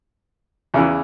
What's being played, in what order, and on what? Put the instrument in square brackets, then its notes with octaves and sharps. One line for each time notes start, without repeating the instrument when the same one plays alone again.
[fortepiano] E2 C#3 E3